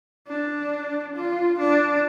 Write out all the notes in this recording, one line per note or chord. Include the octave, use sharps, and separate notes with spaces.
D4
F4
D4